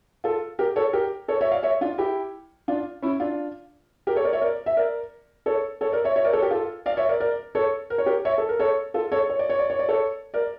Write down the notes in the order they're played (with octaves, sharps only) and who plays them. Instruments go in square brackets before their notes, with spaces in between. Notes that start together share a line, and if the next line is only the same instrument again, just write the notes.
[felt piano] F4 A4
G4 A#4
A4 C#5
G4 A#4
A4 C#5
C#5 E5
D5 F5
C#5 E5
D4 F4
E4 G4
D4 F4
C#4 E4
D4 F4
G4 A#4
A4 C#5
A#4 D5
C#5 E5
A#4 D5
E5
A#4 D5
A4 C#5
A4 C#5
A#4 D5
C#5 E5
C#5 E5
A#4 D5
A4 C#5
G4 A#4
F4 A4
D5 F5
C#5 E5
A#4 D5
A#4 D5
A4 C#5
A#4
C#5
G4 A#4
C#5 E5
A4
A#4
A4 C#5
F4 A4
A4 C#5
C#5
D5
C#5
D5
C#5
D5
A4 C#5
A#4 D5